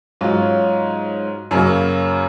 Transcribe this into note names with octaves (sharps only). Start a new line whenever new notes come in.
G#2 F#3 C#4 F4
F#2 C#3 F#3 A#3